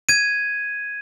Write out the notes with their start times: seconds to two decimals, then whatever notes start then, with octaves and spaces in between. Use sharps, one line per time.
0.09 G#6 D#7